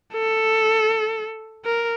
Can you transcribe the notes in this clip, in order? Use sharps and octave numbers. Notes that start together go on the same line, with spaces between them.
A4
A#4